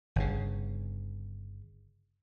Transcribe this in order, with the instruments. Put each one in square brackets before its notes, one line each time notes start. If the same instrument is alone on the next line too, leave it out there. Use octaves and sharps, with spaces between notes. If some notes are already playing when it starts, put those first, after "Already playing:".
[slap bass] G1 C#3